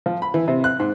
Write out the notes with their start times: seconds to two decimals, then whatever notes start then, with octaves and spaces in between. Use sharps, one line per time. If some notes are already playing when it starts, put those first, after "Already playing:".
0.06 F3
0.22 B5
0.34 E3
0.48 C3
0.64 F#6
0.80 G#2